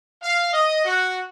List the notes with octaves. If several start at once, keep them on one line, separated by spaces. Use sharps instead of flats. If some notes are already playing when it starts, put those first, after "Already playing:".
F5
D#5
F#4